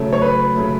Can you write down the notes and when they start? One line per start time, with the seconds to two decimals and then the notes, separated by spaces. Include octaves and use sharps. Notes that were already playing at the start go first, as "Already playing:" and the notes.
Already playing: C#3 F#3 A3
0.13 C#5
0.22 B4
0.55 C#3 F#3 A3